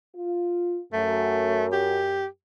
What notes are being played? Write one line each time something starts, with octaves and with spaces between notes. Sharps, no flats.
F4
F#2 A3
G4